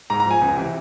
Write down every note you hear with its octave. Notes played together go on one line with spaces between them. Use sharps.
G#2 A#5
A#5
F3 G#5
C#2
C3 E3